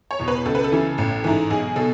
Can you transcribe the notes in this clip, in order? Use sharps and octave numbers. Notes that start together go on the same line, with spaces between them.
C#5
E2 B2
B4
C#2 A4
B4
A4
C#3 E3
A1
G#2 E3
B1 G#4
B2 A4